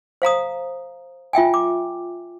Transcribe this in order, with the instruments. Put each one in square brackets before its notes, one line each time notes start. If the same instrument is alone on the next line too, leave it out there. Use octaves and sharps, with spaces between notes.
[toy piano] C5 F5 A#5 D#6
F4 E5 G5 G#5
D6